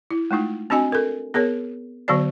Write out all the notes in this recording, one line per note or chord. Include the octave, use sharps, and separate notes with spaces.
E4
G#3 A3 D#4 F4
C4 D4 F#4 D#5 G#5
A4 A#4
B3 G#4 A#4 C#5
D3 F#3 B3 F#4 C5 D5